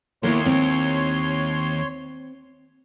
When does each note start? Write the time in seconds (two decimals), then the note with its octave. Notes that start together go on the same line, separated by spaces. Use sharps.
0.23 D#2 A#3 B3 E4 C#5 C6
0.46 C4